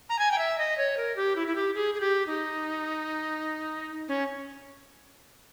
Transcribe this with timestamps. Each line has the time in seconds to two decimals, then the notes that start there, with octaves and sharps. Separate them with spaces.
0.09 A#5
0.19 G#5
0.31 G5
0.38 E5
0.58 D#5
0.77 C#5
0.97 A#4
1.16 G4
1.36 E4
1.47 E4
1.55 G4
1.75 G#4
1.95 G#4
2.00 G4
2.27 D#4
4.08 C#4